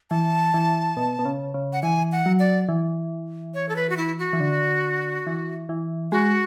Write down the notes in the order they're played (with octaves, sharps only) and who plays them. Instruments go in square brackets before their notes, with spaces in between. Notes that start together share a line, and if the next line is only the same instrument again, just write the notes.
[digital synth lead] E3 [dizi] A5
[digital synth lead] E3
B2
B2
C#3
C#3
[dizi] F#5
[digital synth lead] E3 [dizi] G#5
[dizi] F#5
[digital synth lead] F#3
[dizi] D5
[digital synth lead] E3
[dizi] C#5
A4
B4
F#4
E4
F#4
[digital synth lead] E3
D3
E3
E3
[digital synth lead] G#3 [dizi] F#4